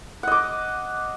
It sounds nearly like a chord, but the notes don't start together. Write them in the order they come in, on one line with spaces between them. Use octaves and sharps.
F#5 D#5 D6